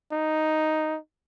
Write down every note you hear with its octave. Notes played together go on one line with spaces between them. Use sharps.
D#4